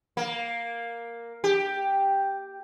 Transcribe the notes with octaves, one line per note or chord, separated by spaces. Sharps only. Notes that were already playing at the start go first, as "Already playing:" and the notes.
A#3
G4